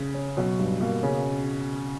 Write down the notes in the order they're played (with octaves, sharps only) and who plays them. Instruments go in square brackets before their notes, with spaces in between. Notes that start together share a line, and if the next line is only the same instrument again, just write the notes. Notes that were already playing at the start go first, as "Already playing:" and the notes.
Already playing: [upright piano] C#3
[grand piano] C#4
[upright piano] B2 [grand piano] F#3
[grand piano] G2
[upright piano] B2 [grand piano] A#3
[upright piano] C#3 [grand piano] C#4